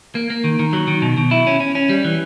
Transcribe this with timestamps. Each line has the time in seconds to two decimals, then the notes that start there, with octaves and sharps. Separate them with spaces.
0.15 A#3
0.30 A#3
0.44 D#3
0.59 D#3
0.73 F#3
0.88 D#3
1.02 B2
1.17 B2
1.31 E4
1.47 C#4
1.60 C#4
1.75 C#4
1.89 G3
2.05 E3